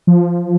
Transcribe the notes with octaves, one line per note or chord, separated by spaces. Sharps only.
F3